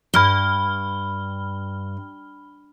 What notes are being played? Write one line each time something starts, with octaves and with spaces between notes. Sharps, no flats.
G2 B5 F6 G7